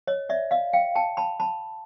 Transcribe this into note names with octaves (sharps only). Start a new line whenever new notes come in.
C#5 D#5
D5 E5
D#5 F5
F5 G5
G5 A5
A5 B5
A5 B5